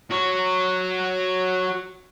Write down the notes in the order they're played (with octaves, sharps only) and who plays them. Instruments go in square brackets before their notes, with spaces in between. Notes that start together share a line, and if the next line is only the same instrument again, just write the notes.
[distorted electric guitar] F#4 C#5